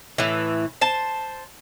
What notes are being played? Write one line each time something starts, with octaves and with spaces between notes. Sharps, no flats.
A2 E3
C5 A5